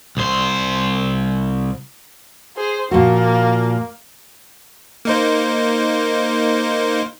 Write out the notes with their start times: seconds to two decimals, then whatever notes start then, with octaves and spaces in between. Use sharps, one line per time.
0.17 C2 C5
2.57 G#4 C5
2.91 A#2 F3 A#3 F#4
5.05 A#3 D#4 C5